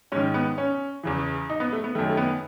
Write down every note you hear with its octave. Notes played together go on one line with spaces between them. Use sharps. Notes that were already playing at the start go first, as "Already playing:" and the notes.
G#2 D#3 C#4
B3
C#4
E2 C#3 E3
D#4
B3
A3
B3
F#2 D#3 A3
A3
B3